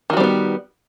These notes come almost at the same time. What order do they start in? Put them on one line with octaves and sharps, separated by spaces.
D#3 F#4 G3 C4 B3